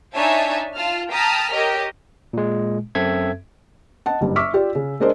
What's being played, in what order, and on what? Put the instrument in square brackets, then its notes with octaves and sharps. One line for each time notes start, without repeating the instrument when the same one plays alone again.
[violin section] D4 D#4 C#5 E5 G#5 A5
F4 A5 F6
G5 A5 A#5 D#6 F6 B6
G4 A#4 C#5 D#5
[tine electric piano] A#2 G#3
F#2 C4 A4 E5 G#6
[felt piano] D#5 F#5 A5
F#1 G2
E5 C#6 D6 E6 F6 B6
F4 G4 D5
C#3
G#3 D4 A#4 C5 D#5